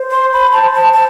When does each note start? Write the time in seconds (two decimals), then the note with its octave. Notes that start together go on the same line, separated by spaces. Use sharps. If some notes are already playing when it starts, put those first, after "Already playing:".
Already playing: C5
0.11 C6
0.33 B5
0.53 A5
0.74 A5
0.93 A5